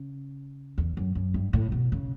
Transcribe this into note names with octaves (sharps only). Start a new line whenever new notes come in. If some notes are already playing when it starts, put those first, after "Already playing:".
Already playing: C#3
E2
F#2
F#2
G2
A2
B2
C#3